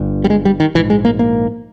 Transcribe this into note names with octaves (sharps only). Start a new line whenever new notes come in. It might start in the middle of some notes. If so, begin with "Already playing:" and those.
Already playing: G1 G2
G3
G#3
G3
D#3
A#1 G#2 E3
G#3
A#3
A#3